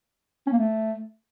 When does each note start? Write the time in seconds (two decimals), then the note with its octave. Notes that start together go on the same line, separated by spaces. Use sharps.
0.47 C#4
0.52 A#3
0.58 A3